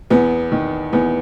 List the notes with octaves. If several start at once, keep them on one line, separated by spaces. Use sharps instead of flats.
E2 B3
D#3
E2 B3